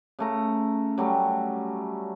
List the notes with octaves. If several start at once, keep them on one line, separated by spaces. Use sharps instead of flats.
C#3 A3 A#5
F#3 G3 A3 C#4